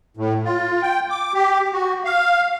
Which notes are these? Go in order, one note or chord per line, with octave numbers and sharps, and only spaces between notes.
A2
F4
G5
D6
G4
F#4
F5